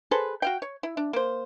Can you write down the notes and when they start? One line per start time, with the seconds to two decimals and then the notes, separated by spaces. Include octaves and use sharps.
0.11 G#4 A4 B4 C5
0.42 F#4 F5 G5
0.62 C#5
0.83 E4
0.97 D4
1.13 A#3 C5